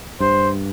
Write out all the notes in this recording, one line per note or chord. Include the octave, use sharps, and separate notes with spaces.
G2 C5